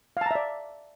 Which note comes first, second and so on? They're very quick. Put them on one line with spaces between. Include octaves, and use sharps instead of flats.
F5 A5 A#5 E5 D5